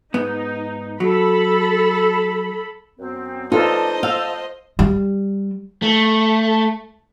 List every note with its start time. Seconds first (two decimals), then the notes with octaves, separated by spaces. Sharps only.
0.14 G#2 B3 D#4
1.00 F#3 A4 B5
2.99 F#2 B3 C4
3.52 D#4 F4 A4 B4 C5 D5 D#5 A5
4.03 F5 A5 E6
4.79 G3
5.82 A3